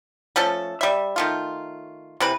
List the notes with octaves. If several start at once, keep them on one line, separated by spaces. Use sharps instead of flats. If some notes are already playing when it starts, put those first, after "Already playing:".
F3 A3 C#4 A4
G3 E5
D#3 A3 F4
C3 E3 B4